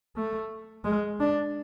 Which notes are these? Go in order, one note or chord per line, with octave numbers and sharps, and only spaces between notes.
A3
G#3
D4